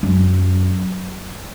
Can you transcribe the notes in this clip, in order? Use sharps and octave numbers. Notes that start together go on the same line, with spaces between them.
F#2